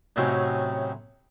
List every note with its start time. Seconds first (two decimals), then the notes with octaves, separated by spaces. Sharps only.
0.16 A2 C3 F#3 C4 C#4 D#4